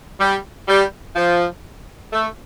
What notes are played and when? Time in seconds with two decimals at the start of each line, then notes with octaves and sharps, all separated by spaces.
0.20 G3
0.68 G3
1.16 F3
2.12 A3